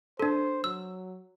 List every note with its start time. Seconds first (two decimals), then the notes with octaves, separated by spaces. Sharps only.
0.19 D4 A4 C5
0.64 F#3 E6